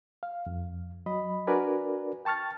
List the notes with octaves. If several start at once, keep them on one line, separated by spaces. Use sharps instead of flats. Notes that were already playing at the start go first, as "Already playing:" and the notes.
F5
F2
F#3 D#5 B5
D4 F#4 A#4 B4 D5 G#5
G5 A5 C#6 F6 A6